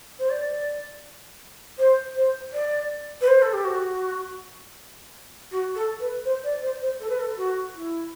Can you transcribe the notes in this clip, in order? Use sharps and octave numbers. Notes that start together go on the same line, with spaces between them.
C5
D5
C5
C5
D5
B4
C5
A4
G4
F#4
F#4
A4
B4
C5
D5
C5
C5
A4
B4
A4
F#4
E4